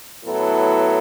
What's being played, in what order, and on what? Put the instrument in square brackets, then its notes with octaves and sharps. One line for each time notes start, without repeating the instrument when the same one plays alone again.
[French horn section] A2 F#3 B3 E4 A4